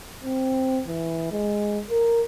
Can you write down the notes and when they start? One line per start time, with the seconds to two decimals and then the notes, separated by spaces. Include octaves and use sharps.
0.24 C4
0.87 E3
1.31 G#3
1.90 A#4